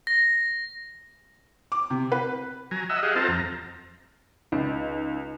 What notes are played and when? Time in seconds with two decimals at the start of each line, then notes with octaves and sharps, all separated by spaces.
0.07 A#6
1.72 D6
1.90 C3
2.12 B4
2.71 F#3 G#5 A#5
2.90 D#5 E5 F#5 E6
3.03 G4 G#4 D#5 F5 F#5
3.16 C4 F4 A4 C5 A5 A#5
3.28 F2 A#5
4.52 C#2 D#4